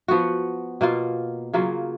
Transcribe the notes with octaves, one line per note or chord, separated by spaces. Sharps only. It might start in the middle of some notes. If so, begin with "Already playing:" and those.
F3 B3 F#4
B2 A#3 F4
C#3 F#3 A#3 F4